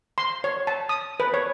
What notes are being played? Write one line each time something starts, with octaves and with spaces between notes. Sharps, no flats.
C6
C#5
A5
D#6
B4
C#5